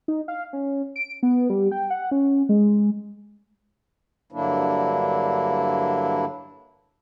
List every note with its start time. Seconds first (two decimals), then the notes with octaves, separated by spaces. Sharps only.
0.08 D#4
0.28 F5
0.53 C#4
0.96 D7
1.23 B3
1.50 G3
1.72 G5
1.90 F#5
2.11 C#4
2.49 G#3
4.32 G2 D3 F#3 A#3 D4 E4